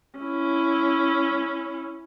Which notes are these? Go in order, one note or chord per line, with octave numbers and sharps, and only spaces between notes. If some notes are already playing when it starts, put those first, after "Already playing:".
C#4 E4